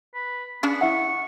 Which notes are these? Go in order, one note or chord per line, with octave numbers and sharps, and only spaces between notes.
B4
B3 C#4 D4 G#4
E4 E5 F#5 C#6